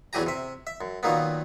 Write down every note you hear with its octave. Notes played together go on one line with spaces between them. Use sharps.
E2 E3 F#3 G4 G#5 A#5
C3 E5
E5
F#2
A#2 D#3 F#3 A#3 B3